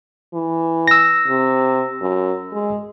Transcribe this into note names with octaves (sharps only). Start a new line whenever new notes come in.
E3
E6 A#6
C3
F#2
G#3